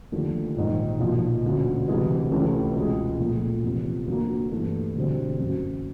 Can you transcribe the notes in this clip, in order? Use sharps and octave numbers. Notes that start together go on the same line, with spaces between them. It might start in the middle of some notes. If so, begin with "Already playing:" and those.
D#2 D3 F3 A3
A#1 G#2 D#3
B1 A#2 F3
E1 D2 C#3
D2 C3 E3 G#3
C#2 C3 E3 A3 C#4
C#2 B2 G#3
A#2 F3 A3
E2 C3 F3
D2 D3 F#3 A#3
G2 E3 A3
E1 D2 D3 G3 C4
F#1 F#2 C#3 F#3